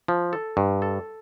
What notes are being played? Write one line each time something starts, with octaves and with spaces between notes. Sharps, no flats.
F3
A4
G2
A4